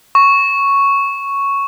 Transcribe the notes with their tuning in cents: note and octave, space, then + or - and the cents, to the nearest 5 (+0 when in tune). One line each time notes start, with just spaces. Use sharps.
C#6 +0